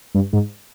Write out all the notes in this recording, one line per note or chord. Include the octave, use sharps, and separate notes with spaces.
G2
G#2